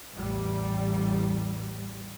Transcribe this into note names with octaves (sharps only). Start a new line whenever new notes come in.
A1 E2 G3